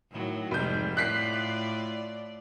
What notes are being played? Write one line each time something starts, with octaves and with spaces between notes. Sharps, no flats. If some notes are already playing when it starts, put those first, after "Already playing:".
A2 D#3 F#3
F1 G#2 G3 G6
A2 F4 D5 F#6 B6 C7